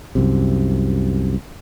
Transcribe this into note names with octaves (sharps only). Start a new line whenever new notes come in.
C2 F#2 C3